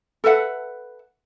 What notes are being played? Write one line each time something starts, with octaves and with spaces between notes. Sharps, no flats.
A4 B4 E5 F#5